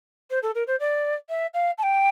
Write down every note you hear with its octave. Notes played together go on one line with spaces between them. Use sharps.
C5
A4
A#4
C5
D5
E5
F5
A5
G5